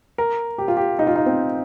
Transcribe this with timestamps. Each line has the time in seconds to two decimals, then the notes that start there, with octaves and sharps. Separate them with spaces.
0.18 A#4
0.58 G4
0.68 F4
0.77 G4
0.99 D#4
1.07 F4
1.16 D#4
1.26 C4